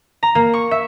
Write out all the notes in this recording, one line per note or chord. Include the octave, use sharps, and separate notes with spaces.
A#5
A#3
C#6
E5